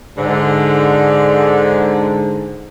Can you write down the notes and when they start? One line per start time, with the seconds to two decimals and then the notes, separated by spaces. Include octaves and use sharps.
0.18 G#2 D3